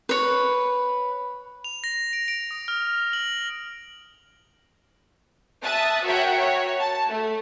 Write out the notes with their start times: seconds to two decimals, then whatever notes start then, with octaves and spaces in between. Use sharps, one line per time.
0.09 B4 C#5
1.64 F7
1.84 A#6
2.13 D7
2.28 D7
2.51 D#6
2.68 F6
3.13 F#7
5.63 E5 A5 D#6 F#6 A6
6.04 F#4 A#4 C#5 E5 F#5 G5
6.38 F#4 C#5
6.79 A5
7.08 A3